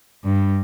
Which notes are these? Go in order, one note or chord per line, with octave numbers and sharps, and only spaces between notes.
G2